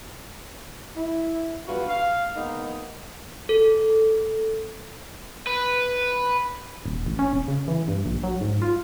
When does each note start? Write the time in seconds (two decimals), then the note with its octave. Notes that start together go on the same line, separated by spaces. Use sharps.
0.96 E4
1.67 E2 G2 F4 F#4 B4 F5
1.89 F5
2.35 G#3 A#3 B3 D#4
3.49 A4
5.47 B4
6.86 D#1
7.06 A1
7.19 C#4
7.33 D#1
7.48 C#3
7.68 E3
7.88 G2
8.06 A#1
8.23 F#3
8.41 G#2
8.62 F4